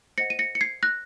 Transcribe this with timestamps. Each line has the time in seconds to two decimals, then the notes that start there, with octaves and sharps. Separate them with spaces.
0.18 C5 D#5 F#5 A#6 C#7
0.30 D#7
0.39 A#6 C#7
0.55 C#7
0.61 G#6 C7
0.83 F#6 A#6